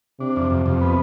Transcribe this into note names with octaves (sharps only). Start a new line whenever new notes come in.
C3 D4
F2
F2
F2 C3
B3